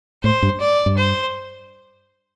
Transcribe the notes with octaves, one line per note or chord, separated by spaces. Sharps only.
A2 C5
G2
D5
G2
C5